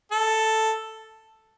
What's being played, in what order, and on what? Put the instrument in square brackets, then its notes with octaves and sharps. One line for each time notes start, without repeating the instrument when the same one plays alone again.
[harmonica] A4